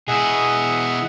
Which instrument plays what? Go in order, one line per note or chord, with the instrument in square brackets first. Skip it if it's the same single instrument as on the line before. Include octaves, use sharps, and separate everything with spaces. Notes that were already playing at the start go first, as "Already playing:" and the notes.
[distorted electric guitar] B2 E4 [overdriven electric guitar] G#4 [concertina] D#5 E5 F#5